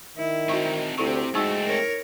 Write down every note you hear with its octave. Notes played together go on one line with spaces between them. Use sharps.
D#3 E4
C4 D#4 F#4 C#6
D2 C3 C4 E4 G4 A4 C#6
G#3 A3 C4 D#4 F#4 C#6 E6
A#4 C#5